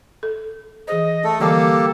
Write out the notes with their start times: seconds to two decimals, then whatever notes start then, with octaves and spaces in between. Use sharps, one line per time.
0.23 A4
0.88 E3 G#4 C5 D#5
1.24 A3 A4
1.40 D3 E3 G3 A#3 G4 A4